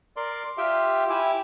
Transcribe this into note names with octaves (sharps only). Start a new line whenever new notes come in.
A#4 D5 C6
F4 G4 E5 G5
E4 G4 G#5 D6 E6